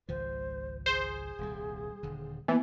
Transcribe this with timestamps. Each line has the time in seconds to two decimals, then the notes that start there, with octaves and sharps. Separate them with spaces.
0.09 G#1 C#2 F3 C5
0.86 G#4 C5
1.39 D#1 C2 G3
2.03 D#1 D3
2.48 E3 A#3 B3